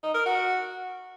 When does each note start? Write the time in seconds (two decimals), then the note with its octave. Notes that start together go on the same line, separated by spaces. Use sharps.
0.03 D#4
0.14 A#4
0.26 F#4